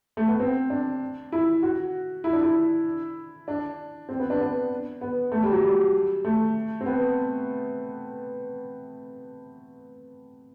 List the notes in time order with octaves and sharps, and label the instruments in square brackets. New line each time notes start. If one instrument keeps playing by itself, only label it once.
[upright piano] A3
B3
C4
D4
E4
F#4
E4
D4
E4
D4
C4
B3
D4
B3
B3
A3
G3
F#3
G3
A3
C4
B3